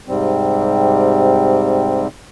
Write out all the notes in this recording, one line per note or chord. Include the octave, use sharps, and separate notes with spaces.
G#2 C3 G3 C4